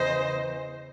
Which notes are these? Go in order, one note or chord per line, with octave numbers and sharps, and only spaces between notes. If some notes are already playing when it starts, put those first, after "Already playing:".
Already playing: E2 C#3 E3 C5 D#5